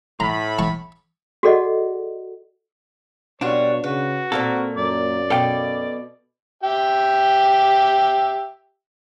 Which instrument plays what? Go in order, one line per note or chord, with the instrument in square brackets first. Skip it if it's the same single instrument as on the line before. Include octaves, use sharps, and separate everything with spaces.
[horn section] A2 B5 [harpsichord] A#5
[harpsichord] A5 C#6
[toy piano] F#4 G#4 A4 D5 D#5 F#5
[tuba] B2 [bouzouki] G3 F4 F#4 [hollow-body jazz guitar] D4 [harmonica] C#5
[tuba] C#3 [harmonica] F#4 [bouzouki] B4
[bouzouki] A#2 G#3 A#3 [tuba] C4 [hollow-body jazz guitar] A4
[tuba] F#2 [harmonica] D5
[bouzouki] B2 [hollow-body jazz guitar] A4 F5 G5
[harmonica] G4 E5 G5